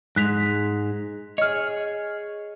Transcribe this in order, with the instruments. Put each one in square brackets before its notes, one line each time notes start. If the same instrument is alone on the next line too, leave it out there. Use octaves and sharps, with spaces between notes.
[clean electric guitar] G#2 G#3 [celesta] F#6 B6 F7
[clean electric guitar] G#4 C#5 [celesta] D#5 F6